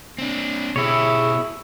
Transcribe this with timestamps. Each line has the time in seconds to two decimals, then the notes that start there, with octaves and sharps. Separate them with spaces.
0.18 C4 D4
0.76 B2 E4 G4 G#4 C#5